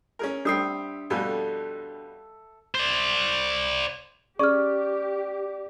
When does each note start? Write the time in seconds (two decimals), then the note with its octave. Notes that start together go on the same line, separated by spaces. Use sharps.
0.19 C#4 G#4 A#4
0.45 G3 C4 D4 E5 D#6 C7
1.10 F2 B2 G3 A4
2.75 C5 D5
4.39 C#4 G4 G#4 D5 C#6 F6